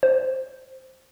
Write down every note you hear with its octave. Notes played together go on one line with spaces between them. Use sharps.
C5